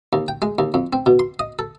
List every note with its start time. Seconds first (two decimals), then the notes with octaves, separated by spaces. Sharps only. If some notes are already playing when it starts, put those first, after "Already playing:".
0.13 D#2
0.28 G5
0.42 G#3
0.59 D#2
0.74 F2
0.93 C4
1.06 B2
1.19 C6
1.39 D#5
1.59 A4